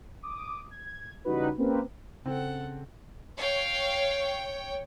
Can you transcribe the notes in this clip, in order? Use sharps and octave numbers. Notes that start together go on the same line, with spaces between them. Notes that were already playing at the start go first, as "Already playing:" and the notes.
D6 D#6
G#6
C#3 E3 G3 D#4 F#4 B4
A#3 C4 C#4 G4 A#4 B4
C#3 C4 A4 F#5
C#5 F5 G5